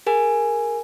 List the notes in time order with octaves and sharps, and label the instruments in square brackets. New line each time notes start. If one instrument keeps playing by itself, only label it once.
[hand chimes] G#4 A#4 G#5